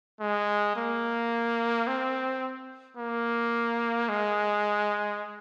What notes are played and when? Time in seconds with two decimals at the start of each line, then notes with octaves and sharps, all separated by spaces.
0.21 G#3
0.76 A#3
1.88 C4
2.97 A#3
4.09 G#3